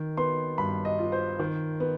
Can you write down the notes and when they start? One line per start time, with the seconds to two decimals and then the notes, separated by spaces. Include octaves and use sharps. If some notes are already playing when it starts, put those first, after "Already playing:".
Already playing: D#3
0.17 B3 C6
0.58 G2 B5
0.85 D#5
0.99 F4
1.12 C5
1.39 D#3
1.80 B3